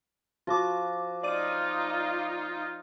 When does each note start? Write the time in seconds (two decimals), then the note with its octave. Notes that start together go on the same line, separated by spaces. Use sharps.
0.47 F3 F4 F#4 D6
1.23 D#4 F4 D5 D6 D#7